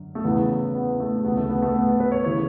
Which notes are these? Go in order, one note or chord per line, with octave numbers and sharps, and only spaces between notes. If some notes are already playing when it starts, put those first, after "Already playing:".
Already playing: F#2 D3
A3
E2 C#3 E3 B3
B3
A3
D2 C#3 E3 B3
A3
B3
A3
B3
B4
C#5
C#3 E3 C#5